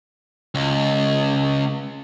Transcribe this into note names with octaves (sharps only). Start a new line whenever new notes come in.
C#2